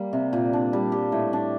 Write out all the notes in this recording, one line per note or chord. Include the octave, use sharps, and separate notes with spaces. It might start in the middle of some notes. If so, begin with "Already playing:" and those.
Already playing: G3 A#3
C3
A#2
D4
G3
G4
A2
D4